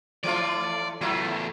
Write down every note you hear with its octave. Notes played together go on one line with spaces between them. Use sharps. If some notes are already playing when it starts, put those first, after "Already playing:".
E3 A3 F4 D5
E2 F#3 A3 E4 F4